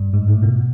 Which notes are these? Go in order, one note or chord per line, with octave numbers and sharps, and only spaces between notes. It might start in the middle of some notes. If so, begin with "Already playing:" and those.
Already playing: G2
G#2
A2
B2